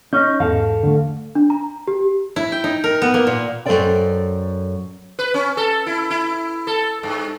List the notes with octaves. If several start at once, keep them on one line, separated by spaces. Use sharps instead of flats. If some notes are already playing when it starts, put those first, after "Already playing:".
C#4 D#4 G6
E2 G#2 A4 F5
D3 A3
D4
A#5
G4
E4
G5
D#4
A#4
B3
A#3
A#2
F#2 D#3 A4 C5 D5 G5
B4
C#4
A4
E4
E4
A4
G2